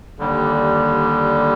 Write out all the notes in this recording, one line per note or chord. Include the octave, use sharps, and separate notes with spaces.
D#2 D3 G3